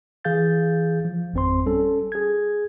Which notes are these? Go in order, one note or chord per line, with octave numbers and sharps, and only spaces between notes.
E3 G#4 F5 G6 A6
F3
G#1 F2 C4 C5 C6
G3 C#4 A4
G#4 G#6